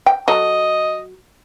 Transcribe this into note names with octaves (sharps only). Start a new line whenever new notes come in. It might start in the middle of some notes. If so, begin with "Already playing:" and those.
G5
F#3 A4 D#5